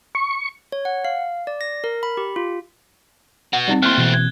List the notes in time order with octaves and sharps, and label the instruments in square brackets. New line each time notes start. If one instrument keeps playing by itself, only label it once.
[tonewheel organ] C#6
[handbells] C#5
F#5
F5
D5
A#6
A#4
B5
G4
F4
[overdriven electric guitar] B3 F#4 [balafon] F#5
[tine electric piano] G3 D#4 [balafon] C4 D5
[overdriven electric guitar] A3 C4 [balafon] A#3 E4 [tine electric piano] C6 F6 [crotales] F#6 G7
[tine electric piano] B2 E3
[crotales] G#6